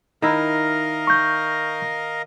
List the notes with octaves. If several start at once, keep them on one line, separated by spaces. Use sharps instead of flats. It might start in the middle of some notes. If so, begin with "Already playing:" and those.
D#3 E4 A#4 D#5 F5
C#6 G6